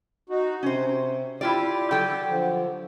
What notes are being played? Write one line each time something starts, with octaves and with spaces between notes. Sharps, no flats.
D#4 F#4
C3 C#4 C5
E4 F4 G4 D5
F#3 A4 G5
D3 F3